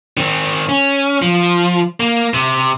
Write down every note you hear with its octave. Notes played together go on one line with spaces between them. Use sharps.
D#3 C4
C#4
F3
A#3
C3